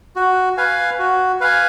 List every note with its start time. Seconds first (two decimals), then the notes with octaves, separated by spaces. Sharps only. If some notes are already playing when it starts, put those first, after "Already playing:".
0.16 F#4
0.57 B4 F5 G#5
0.99 F#4
1.40 B4 F5 G#5